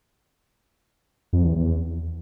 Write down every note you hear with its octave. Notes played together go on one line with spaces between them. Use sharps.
F2
E2
E2